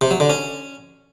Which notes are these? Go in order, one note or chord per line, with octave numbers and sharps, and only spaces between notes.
C3
F#3
D3
C#4